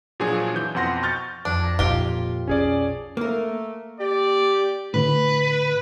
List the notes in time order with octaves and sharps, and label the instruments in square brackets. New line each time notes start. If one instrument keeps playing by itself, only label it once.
[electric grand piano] A#2 F3 F#3 D4 G#4 C#5
E3 G6
F2 B2 F#5 C6 A#6
C#6 F6 G6 A6
[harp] F2 [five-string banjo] D4
[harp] A#5
[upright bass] F2 A#2 [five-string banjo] F4 G4
[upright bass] B1 [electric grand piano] C#4 G#4 D5
[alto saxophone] A3 [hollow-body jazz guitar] A#3 A#4
[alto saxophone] G4 [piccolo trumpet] D5
[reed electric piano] A2 D3 [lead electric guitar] B4